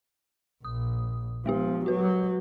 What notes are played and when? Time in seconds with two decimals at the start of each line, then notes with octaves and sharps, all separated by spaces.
0.65 A#1 D#6
1.46 F3 G#3 B3 G4
1.86 F#3 F#4 B4